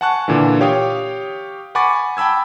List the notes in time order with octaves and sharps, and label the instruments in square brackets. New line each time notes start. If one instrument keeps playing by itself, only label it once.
[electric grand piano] F#5 G#5 A5 C#6 F#6
A#2 D3 E3
G4 C#5 F5 G5 D#6
F#5 G#5 B5 C#6 D6 A6
G5 A5 B5 E6 G#6